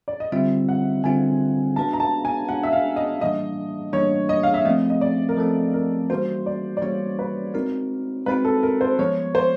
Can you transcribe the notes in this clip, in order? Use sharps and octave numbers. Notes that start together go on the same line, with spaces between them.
D5
D#5
D3 G3 C4 F4 E5
F#5
D3 G3 C4 F4 G#5
G#3 B3 D4 F#4 B4 A5
A#5
A5
G#5
G#3 B3 D4 F#4 B4 F#5
E5
F5
D#5
A2 E3 G3 A#3 D4 D#5
A2 E3 G3 A#3 D4 C#5
D#5
F5
E5
F3 A3 C4 D#5
D#5
D5
A#4
F3 A3 C4 A4
A#4
E3 G3 A#3 C#4 F#4 C5
D5
D5
E3 G3 A#3 C#4 F#4 C#5
B4
G#3 C4 D#4 F#4 A#4
G#3 C4 D#4 F#4 B4
A4
A#4
C5
F3 G#3 B3 C#5
C5